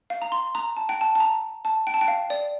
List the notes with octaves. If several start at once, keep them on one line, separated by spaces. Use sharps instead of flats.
F5
A#5
C6
A#5
A5
G5
A5
A5
A#5
A5
G5
A5
G5
F5
D5